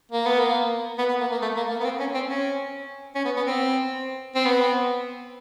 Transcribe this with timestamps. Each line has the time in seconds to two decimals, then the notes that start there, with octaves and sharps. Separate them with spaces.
0.12 A#3
0.26 B3
0.40 A#3
0.98 B3
1.09 B3
1.21 A#3
1.32 A#3
1.42 A3
1.57 A#3
1.70 A#3
1.80 B3
1.85 C4
2.00 C#4
2.14 C4
2.28 C#4
3.15 C#4
3.25 B3
3.36 B3
3.47 C4
4.35 C4
4.45 B3